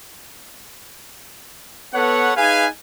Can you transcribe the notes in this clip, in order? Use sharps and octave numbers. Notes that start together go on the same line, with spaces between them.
B3 A4 B4 C#5 F#5
D#4 G#4 B4 F5 G#5